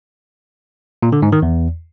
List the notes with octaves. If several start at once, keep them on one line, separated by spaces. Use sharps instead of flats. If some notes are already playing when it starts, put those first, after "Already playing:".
A#2
D3
G#2
D#3
E2